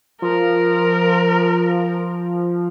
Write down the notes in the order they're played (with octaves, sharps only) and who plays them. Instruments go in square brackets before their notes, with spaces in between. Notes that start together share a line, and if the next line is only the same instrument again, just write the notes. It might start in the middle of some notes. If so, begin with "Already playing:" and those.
[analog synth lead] F3 [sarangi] A#4